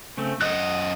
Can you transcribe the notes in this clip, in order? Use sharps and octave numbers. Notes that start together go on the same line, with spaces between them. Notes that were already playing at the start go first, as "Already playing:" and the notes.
C#3 A3 C4
F#2 D#5 F#5 D#6 F#6